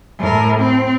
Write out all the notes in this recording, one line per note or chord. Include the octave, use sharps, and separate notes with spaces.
A2 A#4
C4